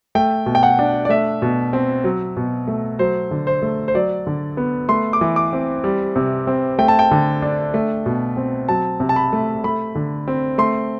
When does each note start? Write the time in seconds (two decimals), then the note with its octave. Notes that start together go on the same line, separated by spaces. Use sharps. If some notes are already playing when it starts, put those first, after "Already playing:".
0.15 A3 G5
0.46 B2
0.55 G5
0.63 F#5
0.79 D4
1.05 D5
1.09 A3 E5
1.42 B2
1.73 C4
2.04 F#3
2.37 B2
2.68 A3
2.99 F#3 C5
3.31 D3
3.47 C5
3.62 A3
3.88 C5
3.95 F#3 D5
4.27 D3
4.57 B3
4.89 A3 C6
5.13 D6
5.21 E3
5.36 D6
5.53 C4
5.84 G3
6.16 C3
6.47 C4
6.78 A3 G5
6.88 A5
6.99 G5
7.11 D3
7.42 D4
7.74 A3
8.06 B2
8.37 C4
8.68 F#3 A5
9.00 C3
9.09 A5
9.16 B5
9.33 A3
9.64 A3 B5
9.95 D3
10.28 C4
10.58 A3 C6